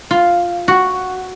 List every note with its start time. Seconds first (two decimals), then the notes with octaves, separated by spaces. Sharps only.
0.11 F4
0.68 F#4